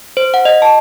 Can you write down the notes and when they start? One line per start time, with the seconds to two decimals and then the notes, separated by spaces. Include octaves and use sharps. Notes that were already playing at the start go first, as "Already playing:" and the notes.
0.17 C5
0.34 F#5
0.45 D#5
0.62 A5